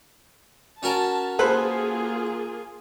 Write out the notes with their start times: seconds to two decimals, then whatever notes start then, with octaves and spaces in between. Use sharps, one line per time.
0.83 C#4 F#4 A#4 A5
1.39 A#3 F4 G#4 A4 B4 C5